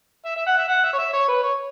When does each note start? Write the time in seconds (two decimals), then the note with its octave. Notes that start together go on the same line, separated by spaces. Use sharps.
0.25 E5
0.36 E5
0.47 F#5
0.58 E5
0.68 F#5
0.83 E5
0.93 C#5
0.98 E5
1.13 C#5
1.28 B4
1.43 C#5